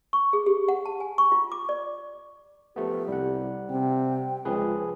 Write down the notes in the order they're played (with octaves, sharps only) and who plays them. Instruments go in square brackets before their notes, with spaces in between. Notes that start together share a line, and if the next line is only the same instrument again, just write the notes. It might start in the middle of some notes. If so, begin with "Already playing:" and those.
[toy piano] C#6
G#4
G4
F#5
A5
G#5
C#6
F4
D6
D5
[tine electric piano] F3 A3 B3 [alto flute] G4
[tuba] C2 [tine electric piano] G3 F#5
[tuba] C3 [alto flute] G5
[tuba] C#2 [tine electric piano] F3 G#4 B4